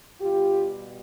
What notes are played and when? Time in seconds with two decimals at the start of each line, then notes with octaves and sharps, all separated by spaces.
0.21 B2 G3 F4 G4